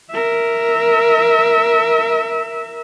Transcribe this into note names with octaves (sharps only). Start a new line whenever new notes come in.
A#4 E5